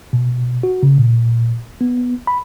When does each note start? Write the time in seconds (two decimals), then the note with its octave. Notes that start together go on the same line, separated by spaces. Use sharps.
0.13 B2
0.63 F#4
0.83 C#3
0.98 A#2
1.81 B3
2.27 B5